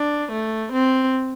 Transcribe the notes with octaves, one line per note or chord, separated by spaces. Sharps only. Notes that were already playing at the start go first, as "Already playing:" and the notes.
Already playing: D4
A3
C4